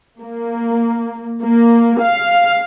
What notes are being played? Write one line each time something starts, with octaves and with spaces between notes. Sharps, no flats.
A#3
A#3
F5